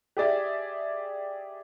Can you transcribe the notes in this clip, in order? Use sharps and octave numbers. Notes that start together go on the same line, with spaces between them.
G4 G#4 D5 E5